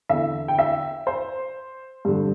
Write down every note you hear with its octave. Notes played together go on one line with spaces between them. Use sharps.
E2 D3 E5
G5
E5
C5
G2 D3